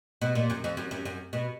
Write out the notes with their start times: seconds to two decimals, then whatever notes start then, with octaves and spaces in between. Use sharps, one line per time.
0.22 B2
0.35 A#2
0.50 F#2
0.64 F2
0.77 F#2
0.91 F#2
1.05 F#2
1.33 B2